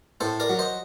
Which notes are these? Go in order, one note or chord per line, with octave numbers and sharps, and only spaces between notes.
A2 A4 C5
A#4 D5
F#3
C5 D#5